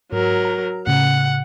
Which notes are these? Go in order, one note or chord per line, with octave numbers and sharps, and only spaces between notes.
G#2 F#3 A#4
A#5
A2 C#3 F#5